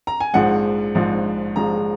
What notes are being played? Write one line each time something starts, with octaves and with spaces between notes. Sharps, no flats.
A#5
G#5
A#1 G#2 F3 G#3 F#5
A#1 G#2 F3 G#3
A#1 G#2 F3 G#3 A#5